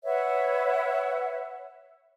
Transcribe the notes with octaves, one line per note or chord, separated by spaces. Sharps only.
B4 C#5 E5 F#5